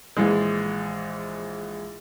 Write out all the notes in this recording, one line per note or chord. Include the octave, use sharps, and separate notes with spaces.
A#1 E3 G#3